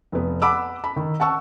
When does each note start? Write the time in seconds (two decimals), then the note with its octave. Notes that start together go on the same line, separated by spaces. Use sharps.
0.12 F1 B3
0.42 F#5 B5 D6 E6
0.84 B5
0.96 D#3
1.20 F#5 A5 C#6 E6